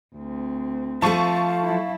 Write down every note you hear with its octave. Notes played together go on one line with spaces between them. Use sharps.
D2 C4
F3 A3 F5 A5 C#6 D#7
F#3 E4